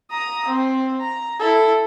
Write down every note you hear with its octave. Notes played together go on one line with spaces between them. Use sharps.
A#5 D#6
C4
A#5
E4 A4